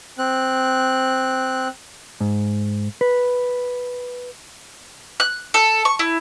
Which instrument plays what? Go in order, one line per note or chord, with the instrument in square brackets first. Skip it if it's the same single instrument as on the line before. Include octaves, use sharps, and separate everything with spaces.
[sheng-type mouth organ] C4 F#6
[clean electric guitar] G#2
B4
[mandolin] F#6
A4
C#6
E4